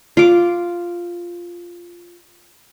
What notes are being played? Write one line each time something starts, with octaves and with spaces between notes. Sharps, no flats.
F4 D6